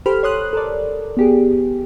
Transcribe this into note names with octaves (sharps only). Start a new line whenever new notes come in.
G4 A4 C5 B5 F6
C#5 C6 D#6 F#6
A4 A#4 D5
B3 G4 G#4